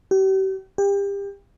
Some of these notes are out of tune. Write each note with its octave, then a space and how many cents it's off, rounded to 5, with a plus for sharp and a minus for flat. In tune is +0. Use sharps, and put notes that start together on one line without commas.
G4 -40
G4 +30